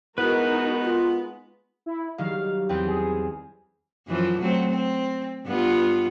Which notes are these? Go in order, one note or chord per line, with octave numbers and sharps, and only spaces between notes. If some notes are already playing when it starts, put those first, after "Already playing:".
G#3 B3 D#4 E4 F#4 A#4 B4 F#6
F4
E4
D#3 F#3 G3 F5
E2 C4 B4 G5
G#4
F#2 E3 F3
F#3 A3 C4
C4
G2 B3 F4